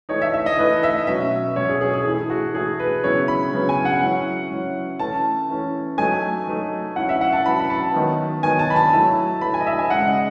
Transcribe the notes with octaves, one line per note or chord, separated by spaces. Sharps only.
E3 A3 D#4 C#5
E5
E5
D#5
E3 A3 D#4 B4
E5
B2 F#3 C#4 E5
B2 F#3 C#4 C#5
G#4
G#4
G#4
E3 A3 E4 G#4
F#4
E3 A3 E4 G#4
B4
C#3 F#3 B3 E4 C#5
B5
C#3 F#3 B3 E4
G#5
F#5
F#3 C#4 E4
F#3 C#4 E4
E3 A3 C#4 A5
E3 A3 C#4
F#3 A3 D#4 G#5
F#3 A3 D#4
F#3 C#4 E4 F#5
E5
F#5
A5
F#3 C#4 E4 B5
B5
A5
D#3 F#3 B3 D#4
D#3 F#3 B3 D#4 G#5
A5
B5
A5
F#3 A3 E4
F#3 A3 E4 B5
G#5
D#5
E5
G#5
C#3 G#3 D#4 F#5
D#5